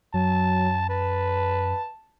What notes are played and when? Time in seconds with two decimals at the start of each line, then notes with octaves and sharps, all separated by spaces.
0.14 F#2 F#3 A5
0.89 B4 A5